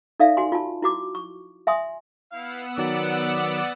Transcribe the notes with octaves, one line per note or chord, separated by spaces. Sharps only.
D#4 A4 D5 E5 F5
F#4 G#5 C6
F4 A5
E4 F#4 D6
C#6
E5 G#5 C6 D#6
B3 E4 F5 F#5 E6
D#3 F#3 D5